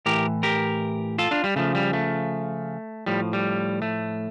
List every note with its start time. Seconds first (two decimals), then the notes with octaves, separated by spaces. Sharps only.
0.06 A2 E3 G4 A#4
0.43 G4 A#4
1.18 F4 A4
1.31 D4 F4
1.44 G3
1.56 C#3 F3 A3
1.75 G3
1.93 A3
3.06 A2 F3 G3
3.33 G3
3.82 A3